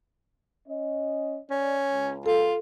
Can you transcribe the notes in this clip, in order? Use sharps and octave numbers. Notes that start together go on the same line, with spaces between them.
C#4 D#5
C#4 D5
C#2
F4 A4